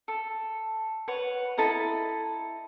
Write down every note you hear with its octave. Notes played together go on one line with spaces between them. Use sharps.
A4
B4 C#5 F#5
E4 A4 D#5 A#5